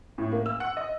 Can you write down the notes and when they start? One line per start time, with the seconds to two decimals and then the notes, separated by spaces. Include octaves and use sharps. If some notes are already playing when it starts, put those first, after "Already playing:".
0.18 A2
0.32 A#3
0.46 E6
0.60 F#5
0.77 D#5